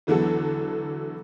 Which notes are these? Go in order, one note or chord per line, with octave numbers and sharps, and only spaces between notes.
E2 D3 E3 F#3 B3 A4